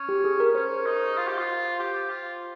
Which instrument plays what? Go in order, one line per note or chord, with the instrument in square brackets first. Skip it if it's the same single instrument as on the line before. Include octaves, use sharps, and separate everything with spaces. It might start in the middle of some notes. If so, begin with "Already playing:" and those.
Already playing: [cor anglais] C#4
[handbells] G4
G#4
A#4
[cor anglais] C#4 [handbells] C5
[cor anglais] D#4
F4
G4
F4
G4
F4